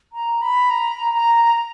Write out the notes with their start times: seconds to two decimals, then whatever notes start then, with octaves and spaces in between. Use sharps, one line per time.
0.13 A#5
0.42 B5
0.70 A#5
1.14 A#5